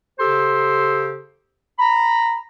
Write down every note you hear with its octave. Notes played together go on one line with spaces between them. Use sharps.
C#3 G4 A4 C5 C6
A#5 B5